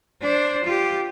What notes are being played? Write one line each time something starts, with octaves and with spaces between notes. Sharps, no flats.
D4 C5
F4 G4